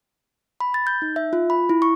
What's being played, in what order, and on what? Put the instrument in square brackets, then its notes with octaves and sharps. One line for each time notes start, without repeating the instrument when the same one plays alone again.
[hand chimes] B5
A6
G6
D#4
E5
F4
B5
E4
C#6